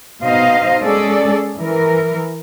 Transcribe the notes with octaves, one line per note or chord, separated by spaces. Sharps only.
B2 D#4 C5 D#5 F5
G#3 C#4 G#4 A4 D5
E3 A#4